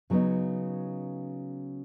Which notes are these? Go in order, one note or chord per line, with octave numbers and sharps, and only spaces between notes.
C#3 F#3 B3 D#4